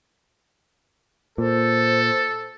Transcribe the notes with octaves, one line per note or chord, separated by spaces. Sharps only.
A#2 A4 C5